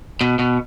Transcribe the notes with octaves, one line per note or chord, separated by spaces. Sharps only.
B2
B2